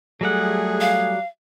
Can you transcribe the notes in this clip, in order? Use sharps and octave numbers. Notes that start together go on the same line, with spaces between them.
F#3 G3 A3 G#4 F#5
F5